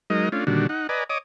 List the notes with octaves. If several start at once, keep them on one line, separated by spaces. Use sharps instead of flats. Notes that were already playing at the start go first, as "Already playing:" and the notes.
F#3 G#3 D#4 A#4 D#5
A3 C#4 D4 F4
A#2 D3 D#3 G3 D4 F#4
D#4 F#5
B4 D5 D#5 G#5 A#5
C#5 D#5 D6 D#6